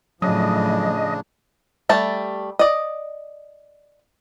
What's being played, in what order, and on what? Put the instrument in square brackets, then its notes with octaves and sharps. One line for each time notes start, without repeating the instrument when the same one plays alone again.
[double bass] A2 F3 [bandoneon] C#3 D4 [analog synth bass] F#3 [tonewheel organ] D#5
[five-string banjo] G3 A3 A5
D5 D#5